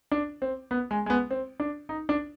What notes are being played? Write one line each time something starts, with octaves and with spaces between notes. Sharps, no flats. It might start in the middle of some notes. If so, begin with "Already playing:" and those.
D4
C4
B3
G#3
G#3
B3
C4
D4
D#4
D4